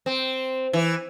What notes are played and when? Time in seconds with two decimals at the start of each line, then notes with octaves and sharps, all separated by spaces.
0.06 C4
0.73 E3